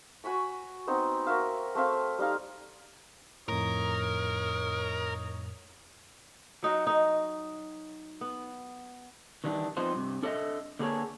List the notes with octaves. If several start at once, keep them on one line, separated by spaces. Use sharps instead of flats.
F#4 G#5 B5 C#6
B3 C4 D#4 F#5
F#4 A#4 E5 F5
A3 C4 E5 F5
G3 D#4 F5
F2 A2 D#4 A#4 C#5 D#6
F#3 D#4 F#4
D#4 D#5
B3
D#3 E3 G3 D4
F3 B3 C4 D#4 F4 C5
G2 C3
D4 A4 B4 C#5 D#5 E5
D3 A#3 B3 G#4 A4 C#5